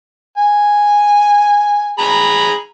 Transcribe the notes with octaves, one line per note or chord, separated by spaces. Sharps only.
G#5
G#4 A#5 B5